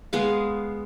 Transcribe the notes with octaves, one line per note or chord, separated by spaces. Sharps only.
G#3 B3 F5